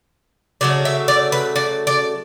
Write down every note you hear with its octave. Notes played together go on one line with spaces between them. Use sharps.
C#3 F#3 A3 D5
E5
D5
B4
D5
D5